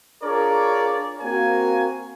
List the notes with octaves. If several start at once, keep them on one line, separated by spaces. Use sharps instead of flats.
D4 F4 G#4 A#4 C#5 D5
A#3 C4 F#4 A#4 F5 G#5